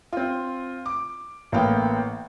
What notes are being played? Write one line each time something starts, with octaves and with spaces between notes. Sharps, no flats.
C4 F4
D6
A1 A#3 B3 F5 G5